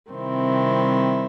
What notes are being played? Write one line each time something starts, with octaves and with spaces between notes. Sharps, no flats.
C3 D#3 G3 C4 E4